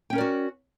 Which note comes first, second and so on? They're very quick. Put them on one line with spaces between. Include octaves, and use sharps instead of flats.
G5 C#4 A#4 D5 F#4